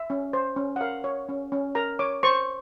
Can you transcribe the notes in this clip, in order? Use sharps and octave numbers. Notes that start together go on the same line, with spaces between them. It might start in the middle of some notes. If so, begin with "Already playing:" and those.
Already playing: E5
C#4
C5
C#4
F#5
A#4 F5
C#5
C#4
C#4
A#4 A#5
C#5 D6
C5 C#6